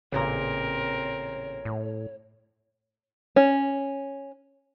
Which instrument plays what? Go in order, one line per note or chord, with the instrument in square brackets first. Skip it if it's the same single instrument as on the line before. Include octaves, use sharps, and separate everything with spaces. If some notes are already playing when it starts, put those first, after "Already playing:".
[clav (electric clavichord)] A1 A#2 [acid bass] C#3 [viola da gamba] C4 A#4 [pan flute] C#5
[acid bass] A2
[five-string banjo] C#4